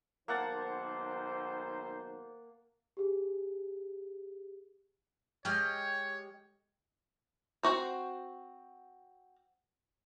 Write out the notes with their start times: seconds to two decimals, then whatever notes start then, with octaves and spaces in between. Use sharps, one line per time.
0.28 B1 D#3 A#3 C5 F#5 A5
2.97 G4 G#4
5.45 G#3 G4 C#5 D#5 F6
7.63 C4 F#4 C5